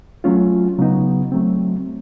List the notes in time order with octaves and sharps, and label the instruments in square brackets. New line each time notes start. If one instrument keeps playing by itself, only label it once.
[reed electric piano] F#3 A3 C#4 F4
C#3 F#3 B3 D#4
F#3 A3 C4